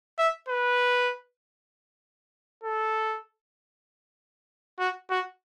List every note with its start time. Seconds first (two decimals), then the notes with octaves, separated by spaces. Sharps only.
0.18 E5
0.49 B4
2.64 A4
4.79 F#4
5.10 F#4